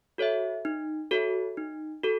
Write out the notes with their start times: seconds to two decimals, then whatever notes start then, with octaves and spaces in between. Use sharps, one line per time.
0.18 F#4 A4 C#5 E5
0.65 D#4
1.11 F#4 A4 C#5 E5
1.57 D#4
2.04 F#4 A4